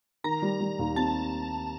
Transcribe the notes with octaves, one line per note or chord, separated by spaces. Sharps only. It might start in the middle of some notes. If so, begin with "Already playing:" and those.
D#3 A#5
G3
G3
D#2
C4 A5